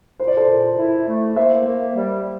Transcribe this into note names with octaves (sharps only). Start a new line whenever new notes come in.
A#2 C5
D5
A4 C5
A#2
E4
A3
A#3 C5 E5
A#3
G3